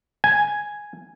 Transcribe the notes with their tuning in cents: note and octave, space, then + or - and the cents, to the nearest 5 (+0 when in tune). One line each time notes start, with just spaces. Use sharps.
G#5 +0